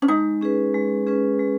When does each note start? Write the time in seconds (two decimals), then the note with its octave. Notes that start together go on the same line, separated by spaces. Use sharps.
0.02 C#4
0.08 G#3 D#4
0.41 C#4 G#4 B4
0.75 G#3
1.07 C#4 G#4 B4
1.39 G#3